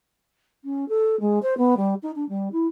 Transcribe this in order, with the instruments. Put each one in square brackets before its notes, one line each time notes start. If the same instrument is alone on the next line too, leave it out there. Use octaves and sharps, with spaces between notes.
[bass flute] C#4
A4
G#3
C5
B3
G3
D#4
D4
G3
E4